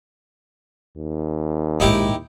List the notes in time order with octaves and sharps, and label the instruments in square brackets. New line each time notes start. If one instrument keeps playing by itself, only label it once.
[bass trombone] D#2
[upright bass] A#1 G#2 [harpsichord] D#4 E4 G4